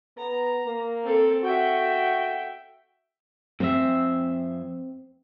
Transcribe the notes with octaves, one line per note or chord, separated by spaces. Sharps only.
B3 A#5
A#3
C4 A4
F#4 E5 G5
F2 C4 E5